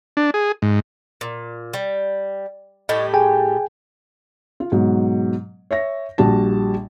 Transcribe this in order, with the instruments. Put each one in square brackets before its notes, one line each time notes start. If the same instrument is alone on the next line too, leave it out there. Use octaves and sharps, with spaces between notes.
[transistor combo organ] D4
G#4
G#2
[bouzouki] A#2
G3
[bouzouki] A2 G3 G4 [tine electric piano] D#5
[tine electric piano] G#4 G5 G#5
[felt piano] F4
G#2 B2 F#3
C#5 E5 A#6
A#1 G3 F#4 A5